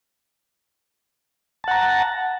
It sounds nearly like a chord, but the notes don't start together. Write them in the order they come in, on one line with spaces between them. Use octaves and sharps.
A5 F#5 A#5